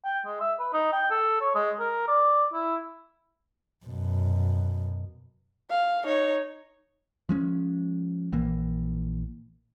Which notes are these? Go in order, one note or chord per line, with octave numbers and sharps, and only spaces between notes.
G5
G#3
E5
B4
D#4
G5
A4
C#5
G#3
A#4
D5
E4
F#2 B2
F5
D#4 C#5
F3 G#3 C#4
A#1 E3 A#3